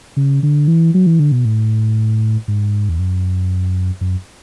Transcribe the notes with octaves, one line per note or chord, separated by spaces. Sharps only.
C#3
D3
E3
F#3
E3
D3
B2
A2
G#2
E2
F#2
F#2